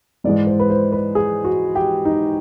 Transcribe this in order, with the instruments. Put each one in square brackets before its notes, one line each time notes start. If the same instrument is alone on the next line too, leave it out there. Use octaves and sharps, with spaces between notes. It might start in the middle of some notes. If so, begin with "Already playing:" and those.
[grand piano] G#2 E3 G#3 D5
C5
B4
C5
B4
G#4
F#4
G4
D#4